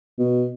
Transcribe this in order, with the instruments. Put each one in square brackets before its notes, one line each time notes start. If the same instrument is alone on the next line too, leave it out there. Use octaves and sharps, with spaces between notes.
[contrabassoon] B2